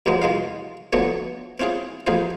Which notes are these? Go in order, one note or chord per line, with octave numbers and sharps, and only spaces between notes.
D2 G2 F3 F#3 G#3
C2 G#3 F4 F5
D3 F3 F#3 A3 B3
C4 C#4 E4 F4 G#4
A1 F2 F4 G#4 B4 C5